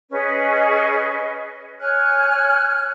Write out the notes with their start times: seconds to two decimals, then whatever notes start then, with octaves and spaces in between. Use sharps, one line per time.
0.11 C#4 G#4 B4 D#5
1.81 C#5 G#5 F6 F#6